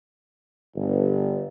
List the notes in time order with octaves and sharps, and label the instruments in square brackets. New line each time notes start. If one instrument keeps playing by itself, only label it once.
[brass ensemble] G1